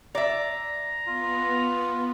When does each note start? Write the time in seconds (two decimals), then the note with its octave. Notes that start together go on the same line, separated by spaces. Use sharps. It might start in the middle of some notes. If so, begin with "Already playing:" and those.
0.15 D5 E5 A#5
1.07 B3 F4